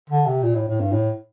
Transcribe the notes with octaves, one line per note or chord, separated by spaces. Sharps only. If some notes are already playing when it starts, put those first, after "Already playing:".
D3
C3
A#2
A2
A2
G2
A2